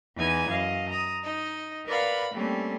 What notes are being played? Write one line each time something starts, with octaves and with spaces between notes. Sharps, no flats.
E2 E3 D#4 G#5 G#6
F#2 D#5 F5
A#5 D#6
D#4 D#5
A#4 B4 D5 F5 F#5 B5
G3 A3 A#3 C4 C#4